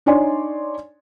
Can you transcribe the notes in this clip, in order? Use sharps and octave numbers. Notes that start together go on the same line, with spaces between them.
D4 D#4 C#5 D5 G#5 C6